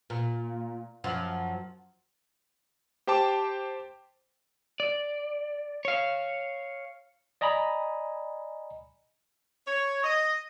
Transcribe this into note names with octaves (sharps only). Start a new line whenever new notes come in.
A#2
F#2 F3
G4 C5 G5 A5 D6
D5
C#5 F5
D5 D#5 G#5 A#5 B5
C#5
D#5